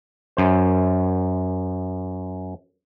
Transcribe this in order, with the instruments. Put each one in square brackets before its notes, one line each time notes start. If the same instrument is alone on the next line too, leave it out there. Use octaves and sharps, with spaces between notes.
[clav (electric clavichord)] F#2 C5